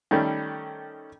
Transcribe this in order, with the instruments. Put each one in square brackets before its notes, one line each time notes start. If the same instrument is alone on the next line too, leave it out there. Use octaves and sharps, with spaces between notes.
[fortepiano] D#3 G3 A3 C#4